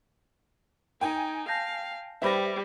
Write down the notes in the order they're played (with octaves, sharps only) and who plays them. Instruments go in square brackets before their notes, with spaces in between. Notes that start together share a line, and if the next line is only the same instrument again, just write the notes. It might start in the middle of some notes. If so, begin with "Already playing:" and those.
[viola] D#4 [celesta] A#4 [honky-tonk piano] G5 G#5
[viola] F5 [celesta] A5 G6 A#6
[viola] G3 [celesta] B4 C5 G5 [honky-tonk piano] E5 B5 A#6